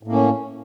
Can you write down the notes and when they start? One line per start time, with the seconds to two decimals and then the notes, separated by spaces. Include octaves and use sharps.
0.03 A2
0.08 A#3
0.12 C#4